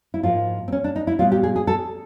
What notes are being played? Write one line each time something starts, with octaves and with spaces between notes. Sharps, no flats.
E4
G#2 F3 A#3 F4
C4
C#4
D4
D#4
E4
A#2 G3 B3 F4
G4
G#4
G#4
A4